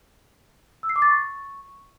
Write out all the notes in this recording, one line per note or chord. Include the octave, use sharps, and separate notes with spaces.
E6
C7
D6
A6
C#6